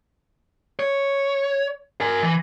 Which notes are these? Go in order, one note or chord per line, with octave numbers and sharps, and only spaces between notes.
C#5
A#4 G#5
E3